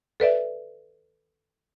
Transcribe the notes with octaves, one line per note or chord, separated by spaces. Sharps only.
A4 B4 D5 E5